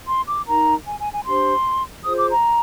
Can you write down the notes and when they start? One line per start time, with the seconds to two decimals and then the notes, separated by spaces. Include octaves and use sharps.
0.08 C6
0.28 D6
0.47 D#4 A#4 A#5
0.86 G#5
1.00 G#5
1.13 G#5
1.26 D4 G4 C5 C6
2.04 F4 G#4 C5 D#6
2.17 D6
2.31 A#5